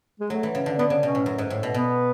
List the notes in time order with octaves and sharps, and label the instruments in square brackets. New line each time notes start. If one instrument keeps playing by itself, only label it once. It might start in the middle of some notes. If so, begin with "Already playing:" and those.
[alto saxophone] G#3
[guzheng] F#3 [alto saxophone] A3
[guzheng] E3
C#3
D3
[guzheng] D3 [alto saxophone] B3
[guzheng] C#3
[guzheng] B2 [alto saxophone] C#4
[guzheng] A2
F#2
G#2
A2
B2
[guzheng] B2 [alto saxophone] B3